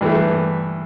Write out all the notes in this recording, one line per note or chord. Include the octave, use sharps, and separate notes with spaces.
G2 E3 A3